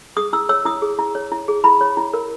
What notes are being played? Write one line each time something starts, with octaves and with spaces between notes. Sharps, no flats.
G#4 D#6
E4 E6
C#5 E6
E4 D#6
G#4
E4
C#5
E4
G#4
E4 B5
C#5
E4
A#4